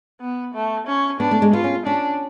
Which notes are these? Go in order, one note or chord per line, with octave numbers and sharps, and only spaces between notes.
B3
A3
C#4
B3 D4
A3
G#3
B3 F4
C#4
C#4 D4